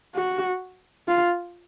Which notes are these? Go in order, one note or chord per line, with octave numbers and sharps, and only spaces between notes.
F#4
F4